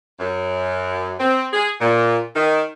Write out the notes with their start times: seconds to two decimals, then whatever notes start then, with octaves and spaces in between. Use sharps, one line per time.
0.20 F#2
1.20 C4
1.52 G#4
1.80 A#2
2.36 D#3